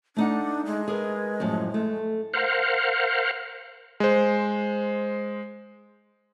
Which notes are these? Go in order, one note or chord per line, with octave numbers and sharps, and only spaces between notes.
A3 D4 D#4 F#5
G#3
G#4 A#4 B4
F#2 A2 F3
A3
A#4 C5 F5 F#5
G#3 C5